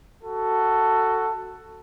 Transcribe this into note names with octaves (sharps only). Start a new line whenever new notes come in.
F#4 A4